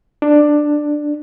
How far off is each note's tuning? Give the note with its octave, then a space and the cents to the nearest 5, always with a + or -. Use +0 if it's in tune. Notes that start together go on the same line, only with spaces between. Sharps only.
D4 +10